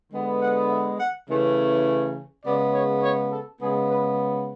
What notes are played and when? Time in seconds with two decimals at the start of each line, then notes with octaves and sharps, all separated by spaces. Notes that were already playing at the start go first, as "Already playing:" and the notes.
0.11 D3 G#3 B3
0.40 F#5
0.70 E5
0.99 F#5
1.27 C#3 E3 A3 C#4
2.45 C#3 G#3 B3 D5
2.73 C#5
3.02 C#5
3.31 A4
3.61 C#3 G#3 B3 G#4
3.90 B4